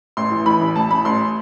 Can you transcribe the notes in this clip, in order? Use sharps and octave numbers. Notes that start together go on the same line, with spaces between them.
A1 C6
E3
E3 B5
A1
A1 A5
A1 B5
A1 C6